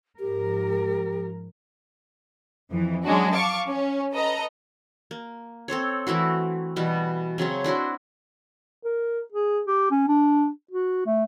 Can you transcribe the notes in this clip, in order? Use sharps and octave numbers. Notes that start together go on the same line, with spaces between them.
G#2 F3 G4 A#4
F2 E3
F#3 G#3 C#4 D4 F#4
F5 A5 C#6 D6
C#4
A4 B4 D#5 A#5
A#3
C4 A4 C5 C#5
E3 A3 E4 F#4
B2 E3 G3 F#5
C#3 F#3 C4 C#4
D4 E4 F#4 C6
A#4
G#4
G4
C#4
D4
F#4
A3